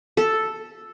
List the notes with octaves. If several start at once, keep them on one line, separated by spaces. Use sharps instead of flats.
A4